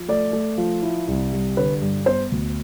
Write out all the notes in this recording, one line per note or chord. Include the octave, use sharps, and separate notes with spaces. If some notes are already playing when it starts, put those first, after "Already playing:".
Already playing: F3
A3 D5
A3
F3
E4
C2
G3
D3 B4
G2
B3 C5
D2